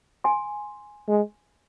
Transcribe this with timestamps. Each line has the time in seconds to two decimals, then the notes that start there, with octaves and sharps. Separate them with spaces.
0.24 G#5 C6
1.08 G#3